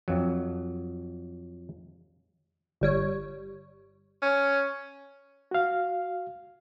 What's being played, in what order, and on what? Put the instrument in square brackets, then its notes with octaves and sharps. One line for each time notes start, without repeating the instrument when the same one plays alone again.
[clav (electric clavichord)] F2 F#3
[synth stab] G1 G3 C#5
[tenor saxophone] C#4
[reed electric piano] F#4 F5